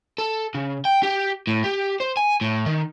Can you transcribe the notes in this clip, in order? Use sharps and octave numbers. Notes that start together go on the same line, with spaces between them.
A4
C#3
G5
G4
A2
G4
C5
G#5
A2
D#3